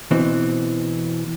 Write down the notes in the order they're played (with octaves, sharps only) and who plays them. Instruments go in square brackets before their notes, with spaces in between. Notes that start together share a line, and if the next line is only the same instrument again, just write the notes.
[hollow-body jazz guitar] B2 E3 C4